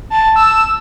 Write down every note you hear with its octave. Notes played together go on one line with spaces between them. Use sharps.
A5
E6